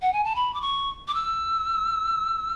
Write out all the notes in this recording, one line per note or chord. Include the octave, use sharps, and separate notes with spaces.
F#5
G#5
A5
B5
D6
C#6
D6
E6